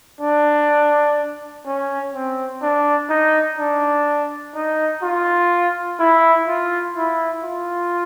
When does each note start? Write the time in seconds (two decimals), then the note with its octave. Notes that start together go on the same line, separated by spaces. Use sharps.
0.21 D4
1.66 C#4
2.14 C4
2.62 D4
3.10 D#4
3.59 D4
4.55 D#4
5.03 F4
5.99 E4
6.47 F4
6.96 E4
7.44 F4